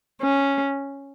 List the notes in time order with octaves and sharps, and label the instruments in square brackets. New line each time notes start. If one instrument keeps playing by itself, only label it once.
[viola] C#4